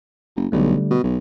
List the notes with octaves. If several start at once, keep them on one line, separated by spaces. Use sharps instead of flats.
F#1
B1 D3 G3 A3
B2
B1